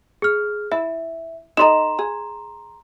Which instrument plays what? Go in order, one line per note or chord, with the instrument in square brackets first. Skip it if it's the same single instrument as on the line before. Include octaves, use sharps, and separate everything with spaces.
[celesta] G#4 F6
[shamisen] E4 [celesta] E5
[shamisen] D#4 A4 D#5 [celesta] A#5 C6 E7
[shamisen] G#4